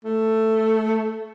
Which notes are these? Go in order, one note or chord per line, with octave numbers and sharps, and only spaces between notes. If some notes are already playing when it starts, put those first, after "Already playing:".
A3